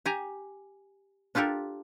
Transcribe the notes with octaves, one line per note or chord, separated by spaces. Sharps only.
G4 G#5 A#5
D4 F4 G4 A4 A#4